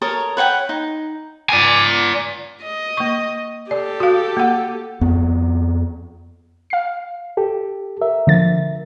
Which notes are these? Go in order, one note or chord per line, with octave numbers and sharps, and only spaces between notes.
A4 A#4 C#5 D#6
B4 C#5 F#5 G5
D#4
D5 G#5
D#5
A#3 C#6
G4 A4 D5
F#4 F5
A#3 F#5
F2 B3
F5 C7
G4 A4
A#4 E5
D3 F3 A6